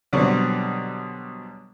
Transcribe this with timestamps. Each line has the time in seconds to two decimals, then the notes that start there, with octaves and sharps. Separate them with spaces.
0.13 B2 D3 F#3 G3 C4 C#6